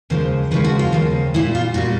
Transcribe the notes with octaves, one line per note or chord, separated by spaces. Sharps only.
D#2 C#3 F3 G#3 C5
D#2 C#3 F3 G#3 B4
F#4
F4
D#2 C#3 F3 G#3
A#2 G3 E4
F4
A#2 G3 F#4